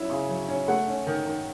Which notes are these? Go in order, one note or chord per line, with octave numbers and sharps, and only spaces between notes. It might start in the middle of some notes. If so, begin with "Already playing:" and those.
Already playing: F#3 C#4 E4
C#3
F#3
C#4
A3 F#5
C#4
D#3
D#3